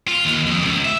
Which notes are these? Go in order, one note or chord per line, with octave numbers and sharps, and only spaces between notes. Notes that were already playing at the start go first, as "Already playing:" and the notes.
F4
D#2
F2
C#2
E5